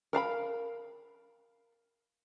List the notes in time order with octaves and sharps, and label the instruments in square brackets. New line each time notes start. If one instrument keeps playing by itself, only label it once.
[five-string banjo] A#4 F5 A#5 B5